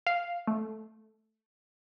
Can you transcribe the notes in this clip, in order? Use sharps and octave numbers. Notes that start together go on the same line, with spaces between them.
F5
A3